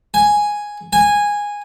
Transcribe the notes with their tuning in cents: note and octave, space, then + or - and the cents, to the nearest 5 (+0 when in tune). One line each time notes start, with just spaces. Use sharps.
G#5 +0
G#5 -10